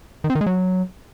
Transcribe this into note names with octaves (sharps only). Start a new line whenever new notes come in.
D#3
C4
D#3
G#3
F#3